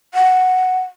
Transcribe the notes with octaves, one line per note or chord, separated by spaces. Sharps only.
F#5